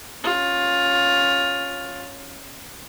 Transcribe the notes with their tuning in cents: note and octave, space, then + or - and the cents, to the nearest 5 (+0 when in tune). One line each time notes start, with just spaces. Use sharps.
C#4 +0 F4 +15